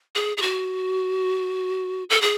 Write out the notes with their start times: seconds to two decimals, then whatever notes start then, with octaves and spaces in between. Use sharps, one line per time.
0.15 G#4
0.37 G#4
0.42 F#4
2.10 A4
2.22 G#4